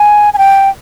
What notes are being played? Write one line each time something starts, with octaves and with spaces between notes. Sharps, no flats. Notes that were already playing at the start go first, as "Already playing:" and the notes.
Already playing: G#5
G#5
G5